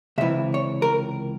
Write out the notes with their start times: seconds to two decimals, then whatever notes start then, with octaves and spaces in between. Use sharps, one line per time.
0.18 C#2 C3 E3 E5
0.54 C#5
0.82 A#4